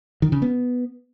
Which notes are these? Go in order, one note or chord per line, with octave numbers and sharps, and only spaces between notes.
D#3
C#3
B3